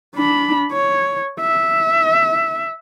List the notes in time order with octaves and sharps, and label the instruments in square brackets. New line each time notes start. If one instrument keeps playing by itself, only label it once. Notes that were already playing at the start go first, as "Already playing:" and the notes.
[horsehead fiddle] D4 B5
C#5
E5